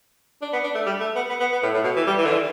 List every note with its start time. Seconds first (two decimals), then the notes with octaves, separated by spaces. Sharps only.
0.42 D4
0.53 B3
0.64 D4
0.74 A3
0.86 G3
1.00 A3
1.15 B3
1.29 B3
1.40 B3
1.52 B3
1.63 A2
1.74 A2
1.84 B2
1.96 E3
2.07 G3
2.17 E3
2.25 D3
2.32 E3